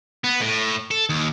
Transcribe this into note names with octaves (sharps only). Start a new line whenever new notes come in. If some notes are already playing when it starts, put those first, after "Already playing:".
B3
A2
A4
D#2